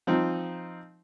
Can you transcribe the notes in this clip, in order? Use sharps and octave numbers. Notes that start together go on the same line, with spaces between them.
F3 C4 D#4